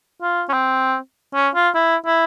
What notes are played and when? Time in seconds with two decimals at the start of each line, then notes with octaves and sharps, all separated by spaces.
0.22 F4
0.49 C#4
0.53 C4
1.34 C#4
1.55 F4
1.74 E4
2.06 E4